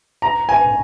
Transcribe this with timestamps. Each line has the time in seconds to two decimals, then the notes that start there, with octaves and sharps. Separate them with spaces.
0.22 A#5
0.49 G#5